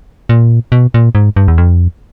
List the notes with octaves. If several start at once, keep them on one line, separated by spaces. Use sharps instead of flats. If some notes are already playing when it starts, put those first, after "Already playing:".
A#2
B2
A#2
G#2
G2
E2
F2